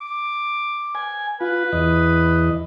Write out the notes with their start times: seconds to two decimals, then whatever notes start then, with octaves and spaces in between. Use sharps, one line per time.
0.01 D6
0.95 G#5
1.41 F4 B4
1.73 E2 D#5